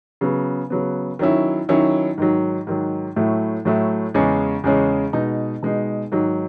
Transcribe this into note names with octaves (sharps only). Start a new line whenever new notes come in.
C#3 F#3 B3
C#3 F#3 B3
D#3 F#3 C#4 E4
D#3 F#3 C#4 E4
G#2 D#3 F#3
G#2 D#3 F#3
A2 F#3 A3 E4
A2 F#3 A3 E4
E2 C#3 G#3 C#4
E2 C#3 G#3 C#4
B2 G#3 D#4
B2 G#3 D#4
G#2 D#3 F#3